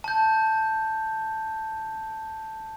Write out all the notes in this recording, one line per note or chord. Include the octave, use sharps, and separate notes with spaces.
A5 G6